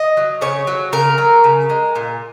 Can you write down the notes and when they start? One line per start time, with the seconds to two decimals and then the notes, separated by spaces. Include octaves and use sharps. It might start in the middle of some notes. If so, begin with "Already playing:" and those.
Already playing: D#5
0.17 F#3
0.41 C#3 C#5
0.67 F#3
0.93 C#3 A#4
1.18 F#3
1.44 C#3
1.70 G#3
1.95 A#2